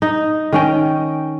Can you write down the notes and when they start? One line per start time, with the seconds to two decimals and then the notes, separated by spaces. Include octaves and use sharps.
0.02 D#4
0.53 D#3 C#4 G5